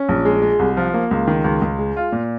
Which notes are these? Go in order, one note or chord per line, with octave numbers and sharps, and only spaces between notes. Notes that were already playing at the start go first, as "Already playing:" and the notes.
Already playing: C#4
A#1
G#3
G#3
C2
F3
A#3
C#2
D#3
C#2
C#2
G#3
F4
A#2